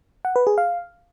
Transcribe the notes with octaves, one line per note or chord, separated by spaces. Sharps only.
F#5
B4
G#4
F5